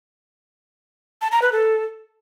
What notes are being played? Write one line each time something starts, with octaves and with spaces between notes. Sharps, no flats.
A5
A#5
B4
A4